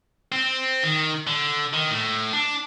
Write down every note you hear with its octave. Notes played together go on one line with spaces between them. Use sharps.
C4
D#3
D3
D#3
A2
D4